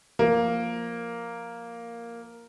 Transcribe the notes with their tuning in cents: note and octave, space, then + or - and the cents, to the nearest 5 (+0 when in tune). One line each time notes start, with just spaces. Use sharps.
F3 +0 A#3 +0